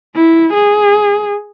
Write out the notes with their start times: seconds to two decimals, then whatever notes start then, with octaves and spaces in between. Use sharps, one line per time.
0.15 E4
0.54 G#4